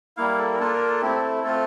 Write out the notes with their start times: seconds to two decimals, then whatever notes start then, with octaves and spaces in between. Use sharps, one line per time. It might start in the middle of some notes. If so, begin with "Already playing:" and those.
0.17 G3 A#3 E4 F5
0.38 A4
0.54 A#4
0.59 A#3 D4 F4 A4
0.73 A#4
0.87 A4
1.01 A3 C4 E4 G4
1.15 A4
1.43 A3 C4 F4 A4